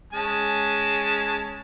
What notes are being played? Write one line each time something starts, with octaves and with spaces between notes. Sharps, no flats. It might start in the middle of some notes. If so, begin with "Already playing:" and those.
G#3 C#4 A5